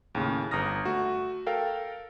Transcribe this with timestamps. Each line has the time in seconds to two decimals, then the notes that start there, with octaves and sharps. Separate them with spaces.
0.15 D#2 A2 C#3
0.51 G1 A#5 D#6 F6 A#6
0.85 A3 F#4
1.46 A4 A#4 F5 G5